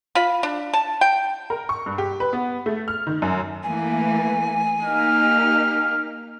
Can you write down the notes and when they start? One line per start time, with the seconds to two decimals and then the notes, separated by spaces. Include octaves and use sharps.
0.15 F4 B5
0.43 D4
0.73 A5
1.01 G5
1.50 A#4
1.69 C#6
1.86 G2
1.98 G4
2.20 B4
2.33 B3
2.66 A3
2.88 F6
3.07 D#3
3.22 F#2
3.63 E3 A3 A#3 G#5
4.83 A#3 D#4 G4 F6